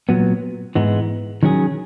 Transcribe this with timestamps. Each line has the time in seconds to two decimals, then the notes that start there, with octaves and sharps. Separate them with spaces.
0.09 A#2 F#3 B3
0.75 G#2 E3 G#3 B3
1.43 D#3 F#3 C#4 G#4